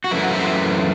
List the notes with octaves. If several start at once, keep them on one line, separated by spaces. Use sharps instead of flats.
F#4
F#2 E3 A3 E4
F#4
C5 E5